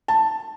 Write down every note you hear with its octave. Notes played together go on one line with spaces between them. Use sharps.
A5